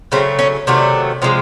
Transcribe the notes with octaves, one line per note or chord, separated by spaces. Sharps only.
C#3 F#3 A3 C4
C#4
C3 D#3 F#3 A3 D4
C3 F3 G#3